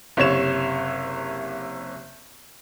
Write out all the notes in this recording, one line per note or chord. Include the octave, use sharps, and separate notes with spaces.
F#1 C3 C#5 E7